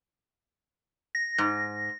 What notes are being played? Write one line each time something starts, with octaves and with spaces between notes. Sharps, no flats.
A#6
G#2